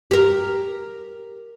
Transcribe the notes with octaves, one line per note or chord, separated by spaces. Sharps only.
G4 A#4